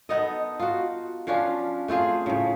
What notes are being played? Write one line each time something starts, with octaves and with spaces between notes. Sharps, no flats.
B3 D#4 A4 D#5
F4 F#4
F3 C#4 D4 F4
A3 C4 F4 G#4
A2 C#3